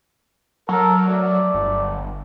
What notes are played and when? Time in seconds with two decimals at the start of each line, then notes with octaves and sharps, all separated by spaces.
0.69 F#3 A4 A#4
1.03 A3 D5
1.54 G1